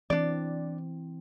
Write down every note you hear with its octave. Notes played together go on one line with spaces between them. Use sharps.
E3 C4 D4 D5